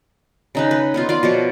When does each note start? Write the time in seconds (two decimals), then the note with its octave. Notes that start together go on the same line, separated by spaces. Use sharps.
0.55 C#3 D#4 B4
0.71 B4
0.94 B3 D#4 F4
1.09 F4 D5 F5
1.23 B2 F3 C#5